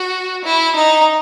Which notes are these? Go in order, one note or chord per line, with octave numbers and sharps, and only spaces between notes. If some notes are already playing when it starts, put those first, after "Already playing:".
Already playing: F#4
E4
D#4